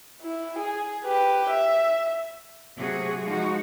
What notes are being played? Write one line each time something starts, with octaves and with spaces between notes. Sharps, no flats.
E4
G#4
G4 B4
E5
C3 F#3 A3 F#4 G#4
F3 G#3 D#4 F#4